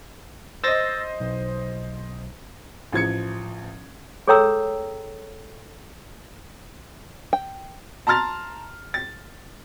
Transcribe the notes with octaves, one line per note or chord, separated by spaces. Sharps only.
C5 D#5 E6 A6 A#6
B1
A1 F3 G#6 C#7
G#4 A4 C#5 G5 A#5 E6
G5
A5 A#5 C6 F6 A6
A6